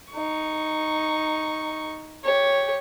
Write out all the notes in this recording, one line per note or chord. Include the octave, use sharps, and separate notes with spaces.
D#4 C#6
G4 C#5